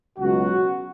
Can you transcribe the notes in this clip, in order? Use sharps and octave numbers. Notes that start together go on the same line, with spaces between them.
C#2 B2 F#3 F#4